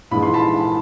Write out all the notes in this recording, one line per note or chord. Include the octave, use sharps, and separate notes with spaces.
A#1 G#2 E3 G#3 B5
C6
A5 B5